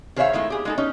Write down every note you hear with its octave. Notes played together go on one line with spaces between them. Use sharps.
D#3 G#4 C5 C#5 E5 F5
D#3 G#3 A3 E4
G4 G#4
G#3 D#4 A4
C#4 D#4